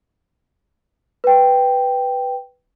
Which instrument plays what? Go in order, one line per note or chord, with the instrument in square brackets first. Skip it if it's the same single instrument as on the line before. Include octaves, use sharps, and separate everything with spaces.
[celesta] B4 G5